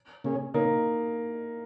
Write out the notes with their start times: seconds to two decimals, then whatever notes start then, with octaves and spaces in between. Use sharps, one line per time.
0.24 C#3 A#3 C#4 G#4
0.54 C#3 A#3 D#4